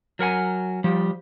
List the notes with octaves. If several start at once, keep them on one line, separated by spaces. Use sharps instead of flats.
F#3 A#4 F#5 G#5
F3 G3